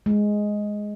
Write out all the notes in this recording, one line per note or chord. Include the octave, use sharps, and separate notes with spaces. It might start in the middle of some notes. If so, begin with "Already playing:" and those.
G#3